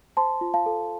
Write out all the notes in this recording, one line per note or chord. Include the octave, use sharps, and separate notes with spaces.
C5 A5 C6
F4
F5 A5
A4